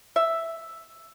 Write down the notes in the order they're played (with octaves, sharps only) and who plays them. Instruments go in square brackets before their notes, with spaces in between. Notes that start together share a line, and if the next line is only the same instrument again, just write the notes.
[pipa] E5